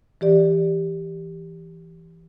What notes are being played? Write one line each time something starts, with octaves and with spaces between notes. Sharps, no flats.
E3 G4 D5